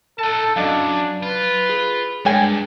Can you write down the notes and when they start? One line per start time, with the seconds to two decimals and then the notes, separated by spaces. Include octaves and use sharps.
0.19 D#4 A4 A5
0.56 F#2 F#3 D4 D#5 F5
1.22 F4 B4
1.70 G#4
2.25 G2 G#3 G#4 G5 G#5